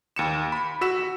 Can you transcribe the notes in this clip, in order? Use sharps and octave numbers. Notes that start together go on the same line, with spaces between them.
D#2 C#7 E7
B5
F#4 E6 B6 E7